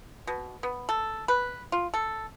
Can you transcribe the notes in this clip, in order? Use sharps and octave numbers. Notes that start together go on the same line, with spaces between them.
B2
B3
A4
B4
F4
A4